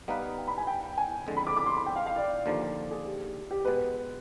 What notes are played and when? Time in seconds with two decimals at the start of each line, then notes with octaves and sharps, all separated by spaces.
0.08 G3 B3 D#4 B4 F5
0.38 G5
0.48 B5
0.58 G#5
0.67 G5
0.98 G#5
1.27 F2 D3 G#3
1.37 B5
1.47 D6
1.57 D6
1.66 C6
1.77 B5
1.86 G5
1.96 F5
2.06 F5
2.16 D5
2.46 D#2 D3 F3
2.91 G#4
3.06 G4
3.51 G4
3.65 B2 G#3 B3 B4